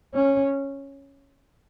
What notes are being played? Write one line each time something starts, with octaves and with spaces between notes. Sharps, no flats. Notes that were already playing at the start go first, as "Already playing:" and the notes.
C#4